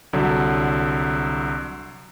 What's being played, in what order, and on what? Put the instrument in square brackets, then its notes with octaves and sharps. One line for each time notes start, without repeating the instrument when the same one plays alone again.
[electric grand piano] C2 D3 F#3